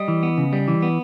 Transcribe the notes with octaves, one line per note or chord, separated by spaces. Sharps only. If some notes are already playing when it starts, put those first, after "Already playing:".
Already playing: G3 D#5
E3
B3
C#3
G3
E3
B3